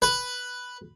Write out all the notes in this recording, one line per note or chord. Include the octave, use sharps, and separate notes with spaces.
B4